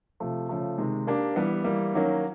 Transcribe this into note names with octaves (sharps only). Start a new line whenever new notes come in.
C3 F3 A3
C#3 F3 A3
C3 D#3 G#3
A#3 D4 G4
E3 G3 B3
E3 G3 A#3
D#3 F#3 A#3 C#4